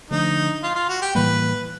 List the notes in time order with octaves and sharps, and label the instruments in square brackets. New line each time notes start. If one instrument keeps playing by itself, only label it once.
[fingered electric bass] D3 F3 A3 D4 [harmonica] D#4
[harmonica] F4
F4
F#4
G4
[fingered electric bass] A2 E3 G3 A#3 [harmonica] B4